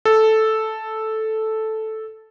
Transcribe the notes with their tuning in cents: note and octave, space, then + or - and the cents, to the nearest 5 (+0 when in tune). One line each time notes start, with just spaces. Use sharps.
A4 -5